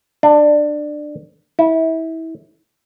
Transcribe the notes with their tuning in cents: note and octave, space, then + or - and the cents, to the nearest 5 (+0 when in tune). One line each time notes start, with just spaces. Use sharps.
D4 +20
E4 -25